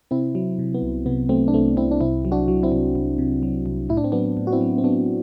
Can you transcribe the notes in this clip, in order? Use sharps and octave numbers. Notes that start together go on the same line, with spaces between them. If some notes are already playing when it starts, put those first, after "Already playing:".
C3 C4 E4
F#3
C3
B3
C2
C3 B3
F#3 A3 C4
D4
C2 A3 C4
C2 C4 E4
D4
C2 C4 E4
F#3
D4 F#4
F#3
C4 E4
C2
C2
C3
F#3
C2
A2 E4
D4
C4
F#3 B3 D4
A2
F#4
C4 E4
F#3
C4
F#3 B3 D4